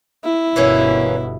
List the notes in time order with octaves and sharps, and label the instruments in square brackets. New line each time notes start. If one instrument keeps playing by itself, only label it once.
[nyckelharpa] E4
[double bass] G1 B2 [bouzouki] E3 A#3 C#4